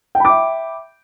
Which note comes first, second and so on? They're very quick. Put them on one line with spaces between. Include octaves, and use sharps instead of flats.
G5 B5 D6 E5